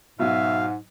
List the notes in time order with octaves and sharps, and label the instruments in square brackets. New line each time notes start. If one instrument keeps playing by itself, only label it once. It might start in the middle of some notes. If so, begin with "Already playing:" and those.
[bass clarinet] G#2 [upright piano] B2 F#3 [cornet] E5 [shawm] F5